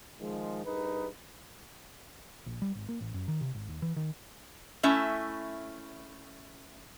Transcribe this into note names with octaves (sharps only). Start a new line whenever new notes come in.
D#3 F3 G#3
G2 D#4 G#4 A#4 B4
A#1
G3
G#1
A#3
A1
F#2
D#3
C3
G#1
D#2
E3
D#3
A3 C#4 E4 E5